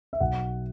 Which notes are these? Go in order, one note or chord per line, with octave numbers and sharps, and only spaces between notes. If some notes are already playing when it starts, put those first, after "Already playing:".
E5
B1 F#5